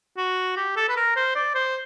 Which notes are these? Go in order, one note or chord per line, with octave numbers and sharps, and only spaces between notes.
F#4
G4
A4
B4
A#4
C5
D5
C5